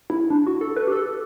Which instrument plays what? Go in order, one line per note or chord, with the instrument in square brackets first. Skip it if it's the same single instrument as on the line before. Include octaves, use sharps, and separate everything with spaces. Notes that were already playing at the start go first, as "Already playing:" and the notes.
[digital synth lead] E4
D4
F#4
A4
B4
G4
A4